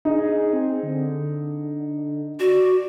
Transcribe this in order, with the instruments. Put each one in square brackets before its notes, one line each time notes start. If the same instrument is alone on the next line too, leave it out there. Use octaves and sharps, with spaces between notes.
[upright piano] D#4 [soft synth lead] G#4
[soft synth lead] C4
D3
[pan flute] F#4 [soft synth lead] D5